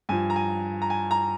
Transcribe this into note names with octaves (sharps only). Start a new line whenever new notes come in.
G2 F3 G#5
A#5
G#5
A#5
G#5
A#5